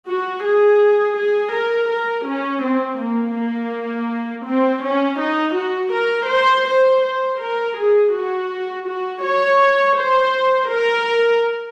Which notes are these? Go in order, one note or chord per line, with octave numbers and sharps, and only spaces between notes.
F#4
G#4
G#4
A#4
A#4
C#4
C4
A#3
A#3
C4
C#4
D#4
F#4
A#4
C5
C5
C5
A#4
G#4
F#4
F#4
C#5
C5
A#4